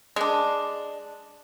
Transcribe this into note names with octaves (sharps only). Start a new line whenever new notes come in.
G#3 D4